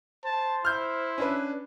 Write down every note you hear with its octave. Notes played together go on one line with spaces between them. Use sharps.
C5 A5
E4 F6 G6
C#4 D4 B4